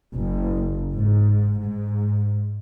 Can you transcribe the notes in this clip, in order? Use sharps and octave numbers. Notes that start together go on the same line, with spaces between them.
F#1
G#2
G#2